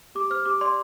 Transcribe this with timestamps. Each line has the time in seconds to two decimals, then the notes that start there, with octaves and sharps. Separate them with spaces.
0.15 G4 D6
0.30 C5 F6
0.45 G4 D6
0.61 D5 C6